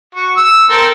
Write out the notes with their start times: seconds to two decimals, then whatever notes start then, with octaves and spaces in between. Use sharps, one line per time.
0.15 F#4
0.37 E6
0.70 C4 A4 A#4